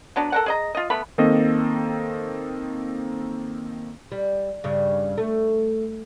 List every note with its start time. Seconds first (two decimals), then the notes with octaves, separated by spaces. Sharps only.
0.16 F#3 B3 D4
0.32 A4 A#4 F#5
0.46 G#4 D#5 A#5
0.75 F4 D#5
0.90 A3 B3 B5
1.18 D#3 A#3 C4 A4 D#5
4.12 G3
4.64 G2 C#3 G3
5.18 A3